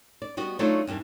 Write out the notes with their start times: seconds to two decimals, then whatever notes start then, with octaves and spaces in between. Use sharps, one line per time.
0.22 D5
0.37 G3 B3 F#4 D#5
0.59 F#3 A3 D4 D#4 F4 C#5
0.87 E2 G2 D#3 E3